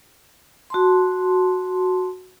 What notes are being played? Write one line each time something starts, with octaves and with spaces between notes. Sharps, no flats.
F#4 A5 C6